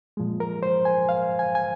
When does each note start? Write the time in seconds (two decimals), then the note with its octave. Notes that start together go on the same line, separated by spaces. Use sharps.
0.17 A#2 F3 G#3
0.40 A#4
0.63 C5
0.85 G#5
1.09 F5
1.39 G#5
1.55 G#5